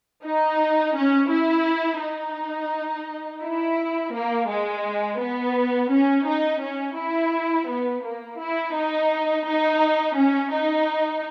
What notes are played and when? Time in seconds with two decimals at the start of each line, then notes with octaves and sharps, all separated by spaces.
0.24 D#4
0.95 C#4
1.31 E4
2.01 D#4
3.43 E4
4.14 A#3
4.50 G#3
5.21 B3
5.91 C#4
6.27 D#4
6.62 C#4
6.98 E4
7.69 B3
8.04 A#3
8.40 E4
8.75 D#4
9.46 D#4
10.17 C#4
10.52 D#4